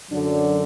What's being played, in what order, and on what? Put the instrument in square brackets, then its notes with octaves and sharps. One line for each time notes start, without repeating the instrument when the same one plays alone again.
[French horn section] F#2 D3 F#3 D4